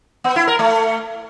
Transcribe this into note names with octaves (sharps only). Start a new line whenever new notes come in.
B3
E4
A#4
A3